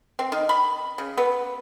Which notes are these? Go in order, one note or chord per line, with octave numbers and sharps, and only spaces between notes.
C4
D#3
B5
C#3
B3